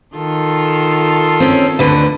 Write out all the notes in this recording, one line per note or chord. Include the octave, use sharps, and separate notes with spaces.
D#3 F4 A4
C4 C#4
D2 D3 B4